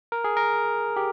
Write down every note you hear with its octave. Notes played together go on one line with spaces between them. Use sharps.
A#4
G#4
A#4
G4